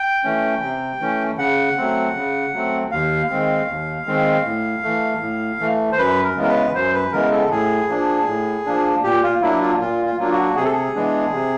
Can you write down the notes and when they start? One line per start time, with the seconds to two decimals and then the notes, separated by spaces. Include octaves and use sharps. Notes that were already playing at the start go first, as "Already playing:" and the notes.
Already playing: G5
0.24 E3 A3 C#4
0.62 C3
1.00 E3 A3 C#4
1.38 C#3 F#5
1.77 F#3 A3 C4
2.15 C#3
2.53 F#3 A3 C4
2.91 D#2 F5
3.30 D#3 G#3 C4
3.68 D#2
4.06 D#3 G#3 C4
4.45 A2
4.83 E3 A3
5.21 A2
5.60 E3 A3
5.92 C5
5.98 F#2 B4
6.24 A#4
6.36 C#3 E3 G#3 B3
6.43 A#4
6.49 B4
6.74 F#2 C5
6.94 B4
7.12 C#3 E3 G#3 B3 A#4
7.32 A4
7.50 A2 G#4
7.89 F3 A#3 D4
8.27 A2
8.66 F3 A#3 D4
9.03 A#2 G4
9.23 F4
9.42 F#3 A#3 D4 E4
9.61 F4
9.80 A#2 F4
10.06 F4
10.19 F#3 A#3 D4 F4
10.32 F#4
10.56 C3 G#4
10.65 A4
10.72 G#4
10.95 E3 G#3 B3 D4
11.34 C3